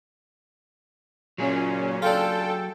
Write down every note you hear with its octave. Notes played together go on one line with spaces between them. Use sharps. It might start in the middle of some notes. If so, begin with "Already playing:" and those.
A#2 F#3 C#4 G#4
D4 F4 A4 G5